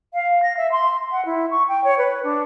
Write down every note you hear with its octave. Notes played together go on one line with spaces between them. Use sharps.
F5
A#6
E5
C6
F#5
E4
C#6
G5
C#5
B4
D4